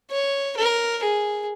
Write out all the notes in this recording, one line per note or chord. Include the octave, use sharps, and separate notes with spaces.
C#5
A#4
G#4